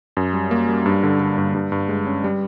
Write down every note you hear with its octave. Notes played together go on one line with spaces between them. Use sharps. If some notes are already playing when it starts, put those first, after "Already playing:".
F#2
G3
A#3
G3
G2
D3
D3
G2
G2
G2
G#3
C#4
G3